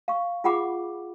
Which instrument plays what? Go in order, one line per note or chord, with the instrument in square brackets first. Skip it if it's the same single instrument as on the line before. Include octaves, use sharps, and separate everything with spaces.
[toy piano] F5 C#6
F4 G#4 F#5 B5 D6